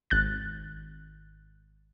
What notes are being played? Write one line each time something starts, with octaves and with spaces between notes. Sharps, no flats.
G#1 F#6 A6